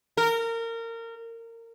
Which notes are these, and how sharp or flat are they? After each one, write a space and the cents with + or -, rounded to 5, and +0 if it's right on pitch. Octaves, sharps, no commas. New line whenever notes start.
A#4 -25